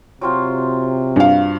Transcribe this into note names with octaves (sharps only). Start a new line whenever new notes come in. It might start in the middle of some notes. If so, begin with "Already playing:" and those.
C3 F#3 C4 F4
G2 F5